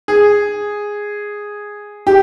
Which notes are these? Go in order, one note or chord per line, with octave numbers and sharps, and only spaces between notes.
G#4
G4